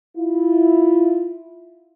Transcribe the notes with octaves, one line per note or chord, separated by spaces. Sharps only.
E4 F4